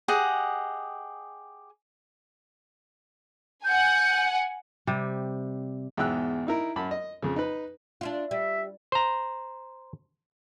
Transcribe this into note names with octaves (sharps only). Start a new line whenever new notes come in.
G4 G#4 D#5 F#5
F#5 G#5 G6
C3 G3
E2 G#2 B2 G5 E6 F#6
D#4 E4 A#4
F#2 A5 B5
D#5
F2 C#3
D#4 B4
D4 E4 F4
G3 E5
C5 A#5